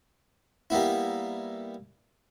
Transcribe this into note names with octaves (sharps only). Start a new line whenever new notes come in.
G3 A#3 B3 E4